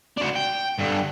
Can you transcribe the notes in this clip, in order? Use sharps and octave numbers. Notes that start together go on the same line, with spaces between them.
D4 F#4
G5
G2 D3